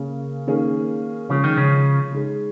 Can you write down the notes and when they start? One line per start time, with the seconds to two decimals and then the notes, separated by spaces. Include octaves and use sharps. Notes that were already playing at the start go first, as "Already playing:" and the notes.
Already playing: C#3 A#3 C#4
0.47 D#3 A#3 C#4 G#4
1.29 C#3 F3 G#3 C#4
1.44 D#3
1.57 C#3
2.12 G#3 D#4 G#4